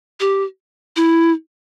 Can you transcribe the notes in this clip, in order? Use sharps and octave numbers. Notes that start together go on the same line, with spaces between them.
G4
E4